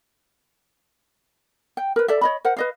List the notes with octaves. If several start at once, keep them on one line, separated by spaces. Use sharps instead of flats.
G5
A#4 B4
A4 D5 E5
C#5 D#5 B5
A#4 C5 F#5
B4 D#5 F5